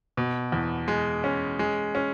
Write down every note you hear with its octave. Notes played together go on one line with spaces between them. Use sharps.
B2
E2
G#3
C#4
G#3
C#4